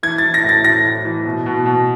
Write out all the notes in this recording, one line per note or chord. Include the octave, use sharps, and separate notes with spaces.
E3 G#6
A6
E3
A#6
A2
A6
A2 A#6
A2
E3
B2
B2
B2